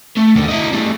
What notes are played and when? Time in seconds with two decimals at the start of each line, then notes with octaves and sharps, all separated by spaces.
0.17 A3
0.36 D#2 D3
0.49 E4 D#5
0.73 G3 A3